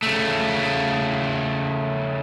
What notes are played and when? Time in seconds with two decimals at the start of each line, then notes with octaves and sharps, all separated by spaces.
0.03 C#3 A3